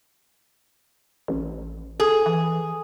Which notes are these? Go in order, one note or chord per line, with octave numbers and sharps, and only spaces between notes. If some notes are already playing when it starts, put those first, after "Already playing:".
A1
G#4 A4
E3